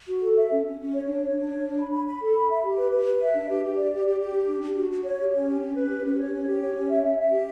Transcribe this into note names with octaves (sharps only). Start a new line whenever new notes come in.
F#4
A4
E5
C#4
C#4
C#4
C#5
D4
C#5
D4
C#5
D4
B5
B5
B5
A4
B5
E5
G4
B4
B4
B4
E5
D4
G4
G4
D5
G4
G4
G4
D4
D4
D4
F#4
F#4
C#5
G4
C#4
G4
C#4
B4
G4
C#4
C#5
C#4
G4
C#5
C#4
E5
E5
E5
G4